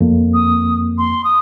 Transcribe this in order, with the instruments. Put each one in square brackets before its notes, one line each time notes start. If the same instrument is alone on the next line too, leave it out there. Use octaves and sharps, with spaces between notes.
[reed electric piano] F2 A#3
[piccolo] D#6
C6
D#6